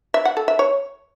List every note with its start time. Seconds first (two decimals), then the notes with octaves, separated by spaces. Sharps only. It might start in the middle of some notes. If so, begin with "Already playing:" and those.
0.14 E5
0.25 F#5
0.37 A4
0.48 E5
0.59 C#5